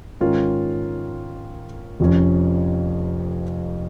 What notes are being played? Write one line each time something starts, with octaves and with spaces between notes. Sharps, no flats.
G#2 D#3 C#4 F4
F1 F2 F3 C#4